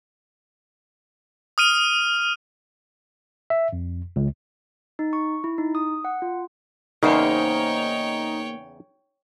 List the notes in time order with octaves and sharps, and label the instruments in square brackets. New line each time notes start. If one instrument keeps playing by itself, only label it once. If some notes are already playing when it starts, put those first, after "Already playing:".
[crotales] D#6 F6 D#7
[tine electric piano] E5
F2
C#2
[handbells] D#4
C#6
E4
D#4
D#6
F#5
F4
[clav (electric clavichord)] E2 C#3 [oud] A#3 C5 [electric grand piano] D#4 [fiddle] C#5 G5